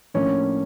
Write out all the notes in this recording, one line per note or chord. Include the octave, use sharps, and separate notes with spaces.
A2 F3 A#3 C#4 D4